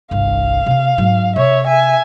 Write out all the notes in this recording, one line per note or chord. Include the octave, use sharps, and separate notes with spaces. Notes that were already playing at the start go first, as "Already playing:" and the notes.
G1 C2 F5
C3 C4
G#2 F#3
C3 C#5 E5
E5 G#5